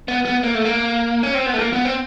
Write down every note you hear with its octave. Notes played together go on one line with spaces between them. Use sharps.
B3
B3
A#3
A3
A#3
C#4
C4
B3
A3
A#3
B3
C4